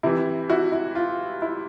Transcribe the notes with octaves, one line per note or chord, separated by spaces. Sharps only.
C3 E3 E4
E4 F#4
E4
F4
E4